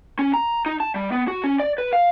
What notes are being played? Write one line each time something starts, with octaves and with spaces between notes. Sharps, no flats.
C#4
A#5
D#4
A5
G3
B3
F#4
C#4
D5
B4
F5